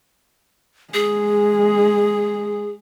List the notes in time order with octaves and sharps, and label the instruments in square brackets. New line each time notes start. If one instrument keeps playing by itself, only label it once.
[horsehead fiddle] G#3 [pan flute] G#4